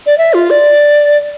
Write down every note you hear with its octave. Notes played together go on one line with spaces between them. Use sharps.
D5
E5
F4
D5